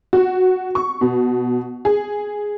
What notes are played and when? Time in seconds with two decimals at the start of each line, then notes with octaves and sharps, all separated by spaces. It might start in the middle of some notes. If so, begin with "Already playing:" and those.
0.13 F#4
0.75 C#6
1.01 B2
1.85 G#4